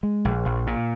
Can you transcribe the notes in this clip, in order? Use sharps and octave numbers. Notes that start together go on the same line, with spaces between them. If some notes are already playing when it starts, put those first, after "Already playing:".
G#3
A#1
A#1
A#2